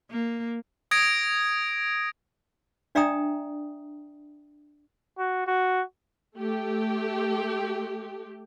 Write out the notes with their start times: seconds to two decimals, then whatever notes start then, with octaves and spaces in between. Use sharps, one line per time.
0.11 A#3
0.91 D#6 G#6 A#6 D7
2.95 D4 D5 E5 G5 A#5 D#6
5.18 F#4
5.47 F#4
6.37 A3 G4